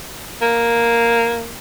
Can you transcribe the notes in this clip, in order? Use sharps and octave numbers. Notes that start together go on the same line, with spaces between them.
A#3